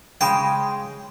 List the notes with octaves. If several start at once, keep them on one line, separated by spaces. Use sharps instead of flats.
C#3 G#3 G5